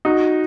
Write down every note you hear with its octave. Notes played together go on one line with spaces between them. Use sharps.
D#4 F#4